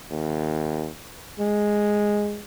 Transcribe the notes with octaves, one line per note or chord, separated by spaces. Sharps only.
D#2
G#3